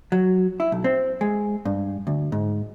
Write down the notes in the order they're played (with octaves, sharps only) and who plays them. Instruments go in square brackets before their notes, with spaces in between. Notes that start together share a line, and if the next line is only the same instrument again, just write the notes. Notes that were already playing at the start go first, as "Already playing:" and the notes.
[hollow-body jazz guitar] F#3
E4
B1
C4
G#3
G2
D2
G#2